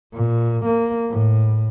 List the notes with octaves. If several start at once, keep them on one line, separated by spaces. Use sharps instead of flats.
A#2
A#3
A2